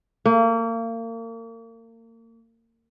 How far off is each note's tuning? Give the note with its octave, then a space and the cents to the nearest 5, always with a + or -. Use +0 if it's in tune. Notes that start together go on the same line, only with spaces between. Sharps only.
A#3 -35